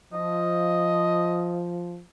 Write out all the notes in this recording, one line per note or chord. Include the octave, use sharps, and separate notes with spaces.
F3 D#5